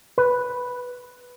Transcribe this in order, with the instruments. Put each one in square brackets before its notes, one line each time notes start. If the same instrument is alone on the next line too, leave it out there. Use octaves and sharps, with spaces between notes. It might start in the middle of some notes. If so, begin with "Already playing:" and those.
[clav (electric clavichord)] B4